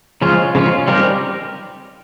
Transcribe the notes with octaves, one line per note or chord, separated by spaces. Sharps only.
C#3 F3 G#3 C#4 F4
C#3 F3 G#3 C#4 F4
G3 C4 D#4 G4 A#4